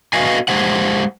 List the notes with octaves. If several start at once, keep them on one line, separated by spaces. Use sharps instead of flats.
F#4 B4 D#5 F5 G#5
G#3 G4 C5 F#5